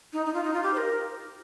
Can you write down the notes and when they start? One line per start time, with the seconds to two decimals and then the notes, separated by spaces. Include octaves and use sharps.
0.13 D#4
0.26 D#4
0.34 F4
0.44 D#4
0.54 F4
0.63 G4
0.74 C5
0.77 A#4